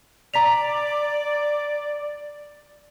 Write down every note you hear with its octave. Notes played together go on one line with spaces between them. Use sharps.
D5 A#5 B6 F7